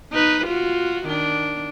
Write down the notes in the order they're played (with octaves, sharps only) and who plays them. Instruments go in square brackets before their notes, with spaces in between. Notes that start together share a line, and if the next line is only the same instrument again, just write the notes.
[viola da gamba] D#4 B4
F4 F#4
D#3 D4